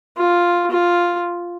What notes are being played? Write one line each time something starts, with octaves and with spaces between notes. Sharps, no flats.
F4
F4